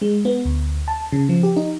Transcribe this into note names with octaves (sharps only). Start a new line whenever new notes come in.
G#3
B3
D2
A5
C#3
F3
G4
D#4